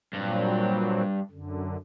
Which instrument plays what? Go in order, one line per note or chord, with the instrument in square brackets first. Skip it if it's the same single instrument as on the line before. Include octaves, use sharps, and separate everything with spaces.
[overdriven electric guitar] G2 [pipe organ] A#2 F#3 C4
[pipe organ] F#2 D3